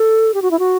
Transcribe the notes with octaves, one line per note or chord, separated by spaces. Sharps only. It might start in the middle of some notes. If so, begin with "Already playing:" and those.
Already playing: A4
G4
F#4
E4
F#4